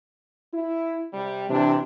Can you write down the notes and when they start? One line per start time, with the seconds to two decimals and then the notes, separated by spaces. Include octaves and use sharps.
0.53 E4
1.14 C3 G3
1.50 C3 E3 D4